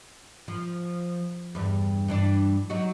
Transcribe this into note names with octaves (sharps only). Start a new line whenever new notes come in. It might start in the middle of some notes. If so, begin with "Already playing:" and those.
F3
E2 G2
G2 E3 D4
F#3 D#4 F#4